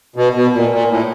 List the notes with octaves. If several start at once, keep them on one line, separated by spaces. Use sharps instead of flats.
B2
B2
A#2
A#2
A2